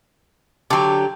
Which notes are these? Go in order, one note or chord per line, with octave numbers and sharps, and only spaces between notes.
D3 F#3 G4